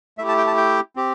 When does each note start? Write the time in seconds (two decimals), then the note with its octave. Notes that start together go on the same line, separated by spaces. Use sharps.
0.18 A3 E4 G4 E5
0.28 A5
0.38 G5
0.47 A5
0.57 G5
0.96 C4 G4